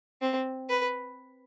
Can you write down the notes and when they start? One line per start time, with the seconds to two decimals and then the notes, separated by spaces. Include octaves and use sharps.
0.21 C4
0.69 B4